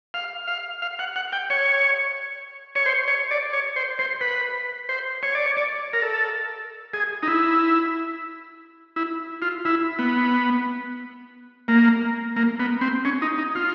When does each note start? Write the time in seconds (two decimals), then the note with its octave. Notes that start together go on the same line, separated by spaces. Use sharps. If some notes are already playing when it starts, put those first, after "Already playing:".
0.14 F5
0.47 F5
0.82 F5
0.99 F#5
1.16 F#5
1.33 G5
1.50 C#5
2.75 C#5
2.86 C5
3.08 C#5
3.31 D5
3.53 C#5
3.76 C5
3.99 C5
4.21 B4
4.89 C5
5.23 C#5
5.35 D5
5.46 C#5
5.57 D5
5.93 A#4
6.02 A4
6.93 G#4
7.23 D#4
7.28 E4
8.96 E4
9.42 F4
9.65 E4
9.99 B3
11.68 A#3
12.36 A#3
12.59 B3
12.81 C4
13.05 C#4
13.22 D#4
13.38 D#4
13.55 F4